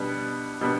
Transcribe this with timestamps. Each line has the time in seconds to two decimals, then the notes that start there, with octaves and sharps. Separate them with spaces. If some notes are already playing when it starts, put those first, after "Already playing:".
Already playing: B2 G3 B3 D4
0.61 B2 G3 B3 D4